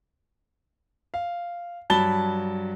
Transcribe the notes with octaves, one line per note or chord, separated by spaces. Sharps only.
F5
G2 F#3 A5 B5 A6 G7